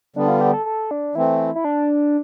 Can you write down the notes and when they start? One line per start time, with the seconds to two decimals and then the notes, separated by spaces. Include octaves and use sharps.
0.16 D3 G3 B3 D4
0.28 F4
0.41 G4
0.54 A4
0.66 A4
0.91 D4
1.15 E3 A3 C4 E4
1.55 E4
1.65 D4